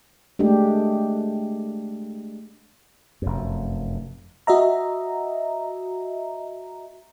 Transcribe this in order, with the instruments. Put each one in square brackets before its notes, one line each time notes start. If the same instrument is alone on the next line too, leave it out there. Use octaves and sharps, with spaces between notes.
[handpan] G#3 A3 D4 G4
[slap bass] F1 F#2
[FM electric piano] F#4 D#5 E5 A#5